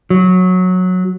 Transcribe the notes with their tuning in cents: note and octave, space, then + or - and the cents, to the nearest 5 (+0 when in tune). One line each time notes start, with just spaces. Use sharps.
F#3 -10